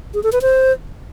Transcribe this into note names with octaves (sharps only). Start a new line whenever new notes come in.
G#4
A4
B4
C5